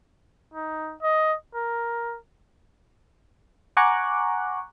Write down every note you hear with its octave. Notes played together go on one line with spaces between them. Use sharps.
D#4
D#5
A#4
F#5 G#5 A#5 C#6 D6 F#6